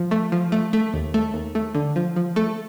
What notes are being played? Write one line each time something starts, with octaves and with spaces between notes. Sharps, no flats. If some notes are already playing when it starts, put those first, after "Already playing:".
Already playing: F3
A3
F3
A3
A3
D#2
A3
D#2
A3
D3
F3
F3
A3